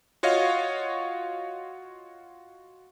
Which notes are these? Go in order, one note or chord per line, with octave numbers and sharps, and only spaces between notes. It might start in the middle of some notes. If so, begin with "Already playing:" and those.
F4 F#4 C#5 D#5 F5